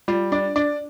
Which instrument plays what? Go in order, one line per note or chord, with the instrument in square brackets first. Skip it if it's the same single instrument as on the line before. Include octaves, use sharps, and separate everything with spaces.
[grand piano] G3 [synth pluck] F4
[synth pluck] D4 [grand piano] D5
[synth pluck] D4 [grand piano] D5